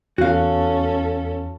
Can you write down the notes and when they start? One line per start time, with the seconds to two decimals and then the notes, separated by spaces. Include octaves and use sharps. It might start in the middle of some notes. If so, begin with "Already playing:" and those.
0.18 E2 C#4 F#4 A4 F5